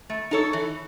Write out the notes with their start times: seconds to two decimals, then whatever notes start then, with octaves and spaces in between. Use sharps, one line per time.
0.10 A3
0.31 D#4 A4 C#5
0.53 E3